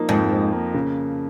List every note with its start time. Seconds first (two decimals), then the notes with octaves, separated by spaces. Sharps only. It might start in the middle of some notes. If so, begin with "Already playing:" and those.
Already playing: F3 A#3 D#4
0.09 F2 G#2
0.31 F3
0.52 A#3
0.74 C#3